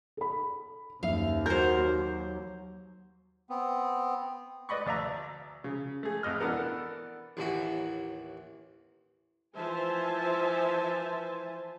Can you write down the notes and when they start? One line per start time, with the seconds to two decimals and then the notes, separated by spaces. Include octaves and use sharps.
0.17 A4 B5
1.03 F#1 D#2 E5 F5
1.46 F#3 A#4 C5 G6
3.50 B3 C4
4.69 B4 D5 D#5 B5 C#6
4.86 D2 D5 E5 A#5
5.64 C#3
6.03 A3 G#4
6.23 A1 F2 D#5 F6
6.40 E3 B3 D4 A4 A#4
7.37 A1 D#2 E3 F#4
9.56 E3 F3 C5 E5 G#5 A5